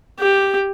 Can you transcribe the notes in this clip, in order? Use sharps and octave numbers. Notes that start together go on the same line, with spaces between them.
G4